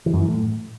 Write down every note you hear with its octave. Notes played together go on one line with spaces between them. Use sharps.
E3
F#2
E3
A2